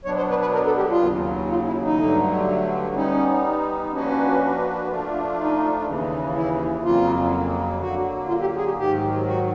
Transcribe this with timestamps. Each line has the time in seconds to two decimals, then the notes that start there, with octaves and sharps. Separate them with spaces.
0.05 B2 F#3 B3 D4 C#5
0.17 C5
0.29 B4
0.41 B4
0.54 A#4
0.66 A4
0.77 G4
0.90 F4
1.01 D#2 C#3 F#3
1.50 F4
1.67 E4
1.82 D#4
1.98 G2 D3 F#3 A3
2.95 G3 B3 C#4 D#4
3.92 F3 A#3 C#4 D4 F#4 B4
4.89 F3 A3 D4 F4
5.38 D#4
5.86 D#2 C#3 E3
6.34 E4
6.83 F2 C#3 F#3 A#3 F4
7.80 D3 F#3 A#3 F#4
8.28 F4
8.41 G4
8.56 G#4
8.65 G4
8.77 G#2 D#3 F#3 G4
9.26 F#4